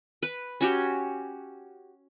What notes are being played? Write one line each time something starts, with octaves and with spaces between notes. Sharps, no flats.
B4
C#4 F#4 G4